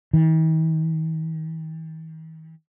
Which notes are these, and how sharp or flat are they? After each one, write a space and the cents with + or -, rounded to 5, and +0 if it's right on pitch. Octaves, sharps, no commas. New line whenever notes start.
D#3 +45